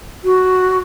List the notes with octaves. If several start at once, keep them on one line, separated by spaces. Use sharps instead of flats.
F#4